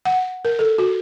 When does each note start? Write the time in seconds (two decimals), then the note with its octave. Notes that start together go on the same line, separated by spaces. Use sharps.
0.05 F#5
0.45 A#4
0.59 A4
0.78 F#4